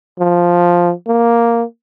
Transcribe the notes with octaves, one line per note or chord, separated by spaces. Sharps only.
F3
A#3